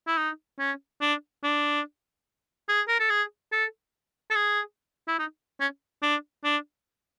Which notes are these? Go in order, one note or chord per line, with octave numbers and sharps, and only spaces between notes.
E4
D#4
C#4
D4
D4
G#4
A#4
A4
G#4
A4
A4
G#4
E4
D#4
C#4
D4
D4